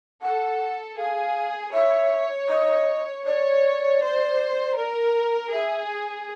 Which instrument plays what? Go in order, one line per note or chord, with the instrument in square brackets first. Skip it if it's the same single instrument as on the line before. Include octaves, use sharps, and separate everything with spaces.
[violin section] A4 [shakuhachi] F#5
[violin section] G#4 [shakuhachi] F5
[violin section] C#5 [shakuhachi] E5
[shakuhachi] D#5
[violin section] C#5 [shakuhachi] D5
[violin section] C5
A#4
[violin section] G#4 [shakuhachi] E5